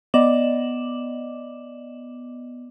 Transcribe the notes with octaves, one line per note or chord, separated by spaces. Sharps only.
B3 D5 D#5 D6 E7 F#7